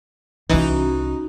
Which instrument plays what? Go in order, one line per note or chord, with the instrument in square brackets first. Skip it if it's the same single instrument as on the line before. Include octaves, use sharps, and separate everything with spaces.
[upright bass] C2 F4 [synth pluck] E3 [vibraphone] C#4 F#4 [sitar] D#4